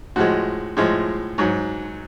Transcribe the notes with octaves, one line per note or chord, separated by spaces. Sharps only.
A2 F3 G#3 F#4
A2 F3 G#3
G#2 F#3